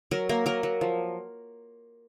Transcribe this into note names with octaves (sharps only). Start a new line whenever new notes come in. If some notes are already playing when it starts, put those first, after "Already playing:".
F#3 A#4
A#3 A#4
F#3 A#4
F#3
F3